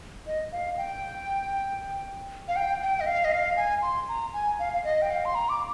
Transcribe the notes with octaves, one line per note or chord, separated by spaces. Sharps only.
D#5
F5
G5
F5
G5
G5
D#5
F5
D#5
F5
G#5
C6
A#5
G#5
F5
F5
D#5
G5
F5
C6
A#5
D6